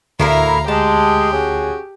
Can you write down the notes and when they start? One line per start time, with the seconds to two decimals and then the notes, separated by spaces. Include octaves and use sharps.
0.20 D2 A2 E4 A#4 F5 A#5
0.68 G#3 G4 A5
1.33 C#4 F#4 G#4